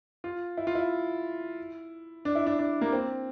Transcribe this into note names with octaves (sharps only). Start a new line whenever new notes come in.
F4
E4
F4
E4
D4
E4
D4
D4
A#3
C4